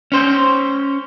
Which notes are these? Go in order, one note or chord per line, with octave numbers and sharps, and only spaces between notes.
C#4 C5